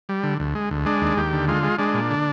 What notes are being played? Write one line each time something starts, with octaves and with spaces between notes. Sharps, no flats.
G3
D3
D2
G#3
D2
G#3 D4
D#2
D#2 G4
D3
G#3 F4
G#3
G#3 D4
A#2
D3